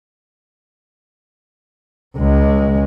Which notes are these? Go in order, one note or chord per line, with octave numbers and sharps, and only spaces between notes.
C#2 G#3